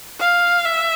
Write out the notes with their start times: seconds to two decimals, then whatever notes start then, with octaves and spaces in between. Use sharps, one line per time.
0.20 F5
0.65 E5